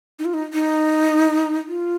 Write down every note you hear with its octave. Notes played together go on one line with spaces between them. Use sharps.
D#4
F4
D#4
D#4
F4